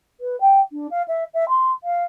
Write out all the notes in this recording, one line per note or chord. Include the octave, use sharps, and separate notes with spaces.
B4
G5
D4
F5
E5
E5
C6
F5